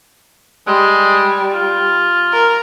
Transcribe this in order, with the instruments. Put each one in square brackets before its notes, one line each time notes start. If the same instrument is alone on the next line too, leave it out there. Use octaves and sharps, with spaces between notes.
[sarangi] G3 [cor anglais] G#3
[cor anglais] F4
[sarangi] A#4